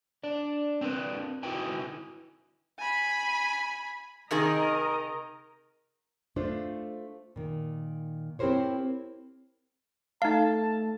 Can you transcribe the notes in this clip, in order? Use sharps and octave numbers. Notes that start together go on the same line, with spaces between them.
D4 D5
C4 D4 A#4 B4
D#4 E4 F#4 B4 G5 G#5
G#5 B5
C3 D#3 G#4 A#4 D#5 A#5
A3 D4 F4 C5
A#2 D#3
C4 E4 G4 A#4 C5 C#5
A3 D#4 F5 A5